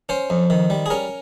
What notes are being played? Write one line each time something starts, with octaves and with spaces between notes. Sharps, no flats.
C#4 C5
F2
D#3
G3
G#4
C#4 A#4